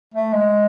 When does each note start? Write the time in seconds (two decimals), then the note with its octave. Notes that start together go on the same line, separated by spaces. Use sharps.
0.14 A3
0.33 G#3